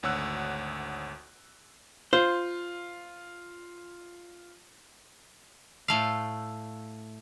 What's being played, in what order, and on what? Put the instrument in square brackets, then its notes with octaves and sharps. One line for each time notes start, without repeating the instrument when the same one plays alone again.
[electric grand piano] G#1 D2 C#5 F#5 E6 F#6
[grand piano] F4 [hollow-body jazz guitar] C5
[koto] A2 A3 F5